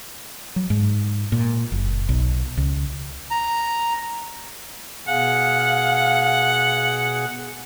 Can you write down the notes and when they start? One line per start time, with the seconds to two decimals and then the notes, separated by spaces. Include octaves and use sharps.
0.56 F#3
0.70 G#2
1.32 A#2
1.72 F#1
2.09 B1
2.57 C#2
3.31 A#5
5.08 B2 G#4 F5 F#5